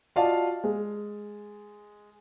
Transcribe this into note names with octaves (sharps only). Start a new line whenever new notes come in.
F4 F#4 D5 D#5 F5 A5
G#3